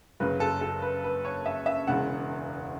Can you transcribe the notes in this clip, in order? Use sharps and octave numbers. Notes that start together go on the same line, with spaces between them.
F#1 F#2 C#3 F#3 B4
A4
A4
B4
B4
C#5
E5
E5
E1 E2 C#3 F#5